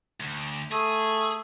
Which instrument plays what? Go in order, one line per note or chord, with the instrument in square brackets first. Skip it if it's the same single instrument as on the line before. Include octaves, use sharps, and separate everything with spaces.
[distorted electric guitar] D2
[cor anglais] A3 [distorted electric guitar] G#4